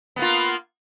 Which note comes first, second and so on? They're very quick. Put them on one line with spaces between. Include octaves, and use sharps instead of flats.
B3 A#3 F4